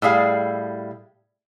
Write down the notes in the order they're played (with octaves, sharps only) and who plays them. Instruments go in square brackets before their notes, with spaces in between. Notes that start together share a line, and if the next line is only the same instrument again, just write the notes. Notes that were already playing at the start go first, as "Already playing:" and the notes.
[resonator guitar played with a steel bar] A2 G3 G#4 F5